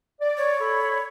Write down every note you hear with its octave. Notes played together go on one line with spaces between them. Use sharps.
D5
C#5
A4 B5